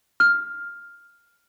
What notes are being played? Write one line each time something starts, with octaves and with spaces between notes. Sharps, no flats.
F6